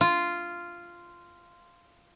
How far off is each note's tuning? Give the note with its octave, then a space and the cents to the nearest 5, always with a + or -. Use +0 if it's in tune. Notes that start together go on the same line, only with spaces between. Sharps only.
F4 -10